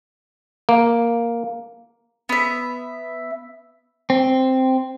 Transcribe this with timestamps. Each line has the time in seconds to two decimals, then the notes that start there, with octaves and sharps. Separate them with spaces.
0.69 A#3
2.29 B3 E5
4.10 C4